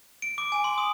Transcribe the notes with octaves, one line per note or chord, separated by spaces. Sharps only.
D7
D6
G#5
C6
D#6